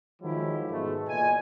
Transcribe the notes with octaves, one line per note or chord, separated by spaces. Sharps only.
D#3 F3 F#3 G#3 E4 G4
G#2 B2 G#3 A3
G1 E2 A#2 D#5 G#5